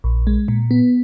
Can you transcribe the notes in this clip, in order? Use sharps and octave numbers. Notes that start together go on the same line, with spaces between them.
A#1
G#3
A#2
B3